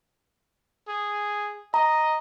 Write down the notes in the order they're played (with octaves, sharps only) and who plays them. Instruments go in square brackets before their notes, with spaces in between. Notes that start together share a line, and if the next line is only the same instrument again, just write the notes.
[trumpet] G#4
[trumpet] D#5 [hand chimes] A#5